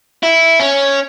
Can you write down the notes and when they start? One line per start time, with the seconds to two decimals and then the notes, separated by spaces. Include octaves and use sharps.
0.23 E4
0.60 C#4